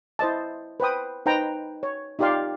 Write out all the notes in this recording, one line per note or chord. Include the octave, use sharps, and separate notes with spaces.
E4 C5 D#5 A5
B4 C5 G5 D#6
D#4 B4 C5 G5 A#5
C#5
D#4 F4 G4 D5 F5 C6